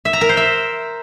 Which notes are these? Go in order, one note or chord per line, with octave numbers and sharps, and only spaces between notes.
E5
A#5
A#4
C5
E5